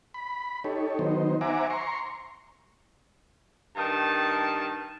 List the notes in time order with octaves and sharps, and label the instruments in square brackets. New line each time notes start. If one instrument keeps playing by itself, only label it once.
[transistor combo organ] B5
D#4 G4 A4 C#5
D#3 F#3 B3 D#4 C5
C5 E5 F#5 G#5 A#5 D6
A#5 C6 C#6
[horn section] G2 D#3 A5